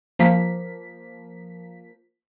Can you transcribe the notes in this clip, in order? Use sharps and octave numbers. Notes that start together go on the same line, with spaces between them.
F3 A#3 B6